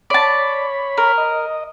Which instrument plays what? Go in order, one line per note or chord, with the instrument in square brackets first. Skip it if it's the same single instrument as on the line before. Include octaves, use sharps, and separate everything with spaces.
[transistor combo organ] C#5 B5 [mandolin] D5 A5
[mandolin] A#4
[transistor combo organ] D#5